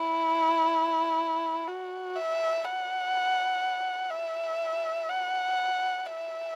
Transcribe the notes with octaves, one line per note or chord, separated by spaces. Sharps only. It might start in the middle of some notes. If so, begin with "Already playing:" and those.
Already playing: E4
F#4
E5
F#5
E5
F#5
E5